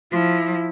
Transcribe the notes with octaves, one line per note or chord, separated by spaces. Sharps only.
F3 E4 F4